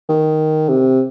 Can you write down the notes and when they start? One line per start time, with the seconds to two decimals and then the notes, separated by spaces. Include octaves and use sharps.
0.09 D#3
0.69 C3